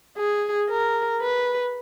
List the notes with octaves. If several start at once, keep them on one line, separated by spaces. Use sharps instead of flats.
G#4
A#4
B4